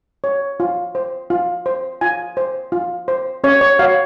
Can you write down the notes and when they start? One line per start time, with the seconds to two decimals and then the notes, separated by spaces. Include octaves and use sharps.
0.24 C#5
0.60 F4
0.95 C5
1.30 F4
1.66 C5
2.01 F4 G#5
2.37 C5
2.72 F4
3.08 C5
3.44 C#4 C#5
3.61 C#5
3.79 F#4 C#5 F5